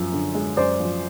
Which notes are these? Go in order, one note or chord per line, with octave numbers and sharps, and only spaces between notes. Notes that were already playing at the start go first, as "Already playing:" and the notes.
Already playing: F#2 F3
D3
G#3
F#2 C5 D5
F3